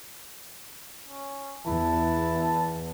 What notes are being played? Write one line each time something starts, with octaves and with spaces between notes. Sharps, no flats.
C#4
E2 E4 A5